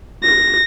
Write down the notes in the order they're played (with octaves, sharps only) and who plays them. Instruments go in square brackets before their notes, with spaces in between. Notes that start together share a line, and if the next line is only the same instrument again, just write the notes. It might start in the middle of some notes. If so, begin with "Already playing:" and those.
[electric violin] A#6